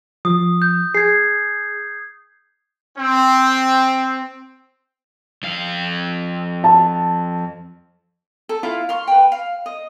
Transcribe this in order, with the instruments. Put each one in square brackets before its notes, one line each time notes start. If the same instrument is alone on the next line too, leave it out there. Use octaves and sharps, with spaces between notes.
[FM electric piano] F3 [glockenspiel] D#6
[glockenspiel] G6
[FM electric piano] G#4 [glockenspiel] G#6 C7
[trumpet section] C4
[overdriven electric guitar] F2 F5
[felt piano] A5
[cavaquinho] A4
E4 F4 F5
F5 C6 C#6
B4 G5
F5
D#5